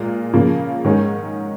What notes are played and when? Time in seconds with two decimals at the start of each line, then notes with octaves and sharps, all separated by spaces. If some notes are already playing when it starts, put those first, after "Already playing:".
Already playing: A#2 G#3 A#4
0.33 C#3 F3 A#3
0.85 G#2 D#3 G#3 C#4